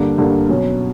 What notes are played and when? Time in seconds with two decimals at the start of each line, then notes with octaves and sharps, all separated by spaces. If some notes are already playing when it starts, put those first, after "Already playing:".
Already playing: G2 D3 A#3 D4
0.18 G2 D3 A#3 D4
0.49 B2 F#3 C#4